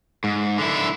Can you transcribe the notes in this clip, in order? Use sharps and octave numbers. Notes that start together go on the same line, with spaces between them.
G#2
D3 E4